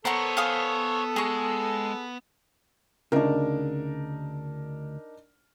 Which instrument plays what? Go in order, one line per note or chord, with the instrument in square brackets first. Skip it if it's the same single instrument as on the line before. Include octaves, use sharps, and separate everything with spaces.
[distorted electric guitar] B3 [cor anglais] A4 [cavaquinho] A#4 F#5 C#6 [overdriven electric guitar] C5 C#5
[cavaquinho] F5 G#5 D#6
[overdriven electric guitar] G#3 [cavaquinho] G#4 C#6
[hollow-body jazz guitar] D2 C#3 [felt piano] D4 D#4 A#4